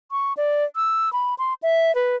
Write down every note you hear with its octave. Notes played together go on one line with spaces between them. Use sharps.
C#6
D5
E6
B5
C6
E5
B4